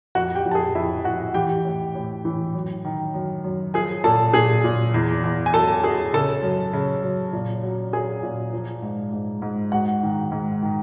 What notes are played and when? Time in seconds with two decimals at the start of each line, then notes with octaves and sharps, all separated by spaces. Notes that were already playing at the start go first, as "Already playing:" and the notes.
0.15 F2 F#4 F#5
0.35 G4 G5
0.45 F2
0.51 A5
0.55 G#4 G#5
0.75 F2 E4 E5
1.05 F2 F#4 F#5
1.34 E3 G4 G5
1.65 A2
1.95 A2
2.25 E3
2.54 F#2
2.85 D#3
3.14 F#2
3.44 F#2
3.74 F3 G#4 G#5
4.04 A#2 A4 A5
4.33 A#2 G#4 G#5
4.64 A#2
4.94 E2
5.24 E2
5.46 G#5
5.53 F#3 A4 A5
5.83 F#3 G#4 G#5
6.13 C#3 A4 A5
6.43 F#2
6.73 C#3
7.03 F#2
7.33 A#2
7.63 F#3
7.93 F#3 G#4 G#5
8.23 A#2
8.53 F3
8.82 G#2
9.12 G#2
9.42 G#2
9.72 G#2 F#4 F#5
10.03 D#3
10.32 G#2
10.62 D#3